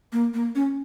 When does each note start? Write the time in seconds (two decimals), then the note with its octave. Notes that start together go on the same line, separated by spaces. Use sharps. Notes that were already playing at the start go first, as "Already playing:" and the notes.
0.13 A#3
0.34 A#3
0.55 C#4